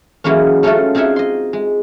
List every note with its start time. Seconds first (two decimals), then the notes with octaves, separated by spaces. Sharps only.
0.24 E3 F#3 G#3 A#3 C#4
0.63 A3 C#4 D#4 F4 F#4 A4
0.95 C4 D#4 F4 G#4 E5 F#5
1.16 D#5 C6
1.53 G#3